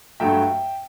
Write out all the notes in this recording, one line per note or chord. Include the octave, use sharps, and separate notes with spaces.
G2 F#3 A3 E5 G5